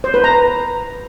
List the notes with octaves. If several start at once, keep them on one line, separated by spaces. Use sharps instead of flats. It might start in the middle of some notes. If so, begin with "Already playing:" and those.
C5
B4
A#5